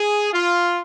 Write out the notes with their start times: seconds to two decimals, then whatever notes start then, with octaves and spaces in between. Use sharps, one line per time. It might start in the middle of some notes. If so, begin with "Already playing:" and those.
Already playing: G#4
0.33 F4